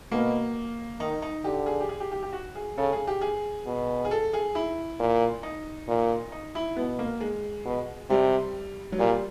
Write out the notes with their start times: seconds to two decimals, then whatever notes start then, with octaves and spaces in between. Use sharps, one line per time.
0.11 B2 A#3
1.00 D#3 D#4
1.22 D#4
1.44 D3 G4
1.66 G#4
1.80 G4
1.89 G#4
2.00 G4
2.12 G4
2.23 G4
2.33 F#4
2.55 G#4
2.78 C#3 A4
2.92 G#4
3.07 G4
3.21 G#4
3.66 B2
4.05 G#4
4.11 A4
4.33 G#4
4.55 E4
5.00 A#2
5.43 D#4
5.88 A#2
6.32 D#4
6.55 E4
6.77 B2 B3
6.99 A#3
7.21 G#3
7.65 B2
8.10 C3 G3
8.92 F#3
8.99 A#2 G3